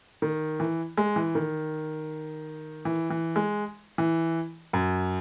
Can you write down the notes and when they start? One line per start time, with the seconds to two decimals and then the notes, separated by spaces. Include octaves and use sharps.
0.22 D#3
0.60 E3
0.97 G#3
1.16 E3
1.35 D#3
2.85 E3
3.10 E3
3.36 G#3
3.98 E3
4.73 F#2